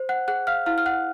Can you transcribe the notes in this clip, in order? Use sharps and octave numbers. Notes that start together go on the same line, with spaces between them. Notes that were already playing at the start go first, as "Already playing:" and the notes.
Already playing: C5
F#5 F#6
G#4 F#5 F#6
F5 F6
E4 F5 F6
F6
F#5 F#6